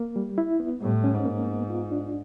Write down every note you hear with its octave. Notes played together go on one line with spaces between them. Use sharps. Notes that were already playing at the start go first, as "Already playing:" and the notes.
Already playing: A#3
G3
E4
B3
A2 G3
C#4
G#2
A#3
B3
F4
D4